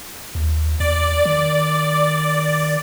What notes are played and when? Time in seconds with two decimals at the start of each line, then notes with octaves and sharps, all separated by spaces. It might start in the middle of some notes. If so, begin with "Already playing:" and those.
0.35 D#2
0.80 E2 D5
1.26 D#3